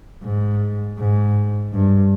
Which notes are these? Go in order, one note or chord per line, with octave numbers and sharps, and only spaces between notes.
G#2
G#2
G2